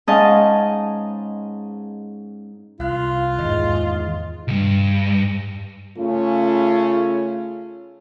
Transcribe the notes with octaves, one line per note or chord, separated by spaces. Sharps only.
G#2 C#4 D#5 F5 G#5 A5
C2 F4 F5 F#6
E2 G#2 D#3 E3 G#3 D#5
C2 G2
C#3 A3 C#4 F4